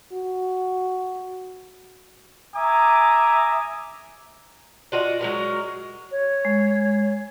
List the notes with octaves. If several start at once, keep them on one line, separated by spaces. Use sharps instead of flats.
F#4
E5 G#5 A#5 D6 D#6
D4 F4 F#4 D#5
F#3 G#3 A#4
C#5
G#3